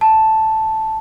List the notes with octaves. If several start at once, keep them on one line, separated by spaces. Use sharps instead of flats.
A5